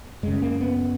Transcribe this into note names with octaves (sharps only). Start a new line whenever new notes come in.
F#2 C#3 G#3
A#3
B3